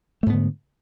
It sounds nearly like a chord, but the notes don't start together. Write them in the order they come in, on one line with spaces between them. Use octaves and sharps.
A3 G#2 B3 D3